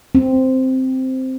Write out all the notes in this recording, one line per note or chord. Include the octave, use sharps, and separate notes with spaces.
C4